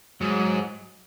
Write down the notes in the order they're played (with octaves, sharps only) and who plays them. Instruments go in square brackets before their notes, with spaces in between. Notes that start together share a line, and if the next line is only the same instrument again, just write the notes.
[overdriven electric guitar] G#2 [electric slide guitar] F#3